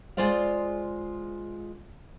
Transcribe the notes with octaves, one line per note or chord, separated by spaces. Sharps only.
G#3 F4 G#4 C5 D5 F5